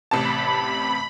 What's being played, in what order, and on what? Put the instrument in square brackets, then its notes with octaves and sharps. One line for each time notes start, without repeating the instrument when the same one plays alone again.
[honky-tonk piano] A1 C3 A5 [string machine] B5